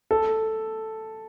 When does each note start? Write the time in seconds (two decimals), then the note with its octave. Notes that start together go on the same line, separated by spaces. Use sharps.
0.11 A4